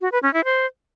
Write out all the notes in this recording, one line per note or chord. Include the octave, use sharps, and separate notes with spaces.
F#4
B4
C#4
E4
C5